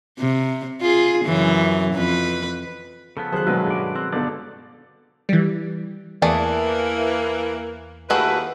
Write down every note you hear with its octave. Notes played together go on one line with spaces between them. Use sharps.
C3
F4 G#4
F#2 C#3 E3
F2 B4
C#3 F3 B3 A4
D#3 F#3 G#4 C5 F#6
A#1 B2 F#3 G#3 F#4 A4 B4
G2 D5
C4 F#6
G1 B2 A4 D5
E3 G3
E2 E3 A3 A#3 G#4 D5
D#2 A3 E4 F#4 G#4 B4